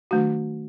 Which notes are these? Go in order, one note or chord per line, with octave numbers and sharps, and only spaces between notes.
D#3 F#3 A3 D4 F#4